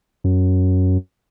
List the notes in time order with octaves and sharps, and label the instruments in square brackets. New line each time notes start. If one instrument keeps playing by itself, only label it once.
[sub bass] F#2